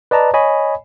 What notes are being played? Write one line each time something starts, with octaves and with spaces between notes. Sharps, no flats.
B4 D5 D#5 A5 A#5
C#5 D#5 G#5 B5